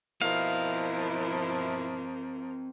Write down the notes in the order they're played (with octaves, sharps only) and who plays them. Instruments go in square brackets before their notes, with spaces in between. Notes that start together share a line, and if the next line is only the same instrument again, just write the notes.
[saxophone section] B2 E4 [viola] F3 A#4 [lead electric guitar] C4 D#5 [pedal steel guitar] F5